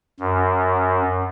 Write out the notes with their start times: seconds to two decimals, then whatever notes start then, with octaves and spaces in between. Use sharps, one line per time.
0.20 F#2